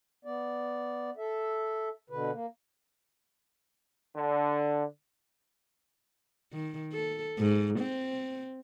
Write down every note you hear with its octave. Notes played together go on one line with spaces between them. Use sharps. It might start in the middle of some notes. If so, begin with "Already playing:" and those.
B3 D5
A4 E5
B2 D3 B4
A#3
D3
D#3
A4
G#2
C4